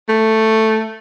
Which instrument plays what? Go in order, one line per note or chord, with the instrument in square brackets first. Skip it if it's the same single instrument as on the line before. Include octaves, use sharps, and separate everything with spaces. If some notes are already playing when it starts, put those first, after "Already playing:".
[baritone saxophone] A3